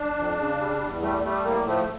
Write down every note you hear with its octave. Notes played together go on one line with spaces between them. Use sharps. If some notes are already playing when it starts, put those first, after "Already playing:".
Already playing: D4
F2
C#3
G3
E2
G3 A3
G3 A3
A2 A#3
F3 A3